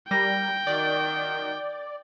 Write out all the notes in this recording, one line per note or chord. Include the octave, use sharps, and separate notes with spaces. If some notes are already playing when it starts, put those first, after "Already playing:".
G3 A#4 G5 A#6
D#3 F#4 D5